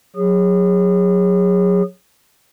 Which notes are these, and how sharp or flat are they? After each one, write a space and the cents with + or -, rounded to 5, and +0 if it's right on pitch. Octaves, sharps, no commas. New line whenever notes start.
F#3 -15 G#4 -30